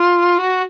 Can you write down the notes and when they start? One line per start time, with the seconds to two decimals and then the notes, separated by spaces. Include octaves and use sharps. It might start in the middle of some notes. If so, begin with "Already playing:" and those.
Already playing: F4
0.38 F#4